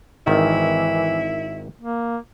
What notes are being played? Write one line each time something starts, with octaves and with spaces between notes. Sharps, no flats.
G#1 D#3 E3 E4
A#3